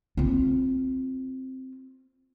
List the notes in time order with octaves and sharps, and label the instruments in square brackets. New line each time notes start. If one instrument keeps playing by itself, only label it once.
[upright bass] C4 F4